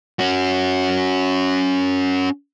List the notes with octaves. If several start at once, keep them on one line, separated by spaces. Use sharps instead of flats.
C#4 F#4